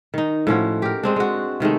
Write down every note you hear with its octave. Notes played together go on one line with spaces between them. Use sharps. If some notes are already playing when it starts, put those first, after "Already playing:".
D#3 D#4
A2 F3 C#4 F#4
G4 A#4
G#3 C4 D4
G#3 F#4
C3 D#3 G#3 A3